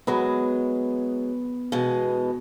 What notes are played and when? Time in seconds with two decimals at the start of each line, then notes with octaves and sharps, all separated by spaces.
0.07 F#3 G#3 B3
1.72 B2 E3 G#3